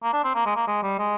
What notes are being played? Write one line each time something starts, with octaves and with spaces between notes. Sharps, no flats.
A#3
D4
C4
A#3
G#3
A#3
G#3
G3
G#3